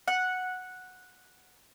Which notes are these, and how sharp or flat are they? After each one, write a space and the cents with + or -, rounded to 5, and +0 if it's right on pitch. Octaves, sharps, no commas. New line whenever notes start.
F#5 -5